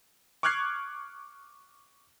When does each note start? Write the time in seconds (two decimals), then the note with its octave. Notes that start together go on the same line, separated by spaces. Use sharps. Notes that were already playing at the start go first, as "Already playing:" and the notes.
0.43 C#6 D6 F6 F#6 G#6 C7